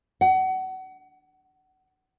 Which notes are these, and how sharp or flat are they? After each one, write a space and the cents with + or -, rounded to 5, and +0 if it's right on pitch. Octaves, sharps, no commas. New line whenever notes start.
F#5 +30